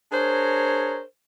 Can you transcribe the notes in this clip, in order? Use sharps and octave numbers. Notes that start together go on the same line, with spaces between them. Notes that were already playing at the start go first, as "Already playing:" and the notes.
D4 G#4 A#4 C5 C#5 A#5